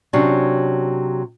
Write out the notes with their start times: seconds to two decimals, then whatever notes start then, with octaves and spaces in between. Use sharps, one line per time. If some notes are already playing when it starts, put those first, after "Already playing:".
0.13 C3 F#3 C#4 D4